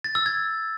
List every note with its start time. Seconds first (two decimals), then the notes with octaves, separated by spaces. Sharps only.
0.04 A6
0.15 E6
0.26 G#6